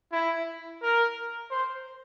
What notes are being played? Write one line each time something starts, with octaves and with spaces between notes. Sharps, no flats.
E4
A#4
C5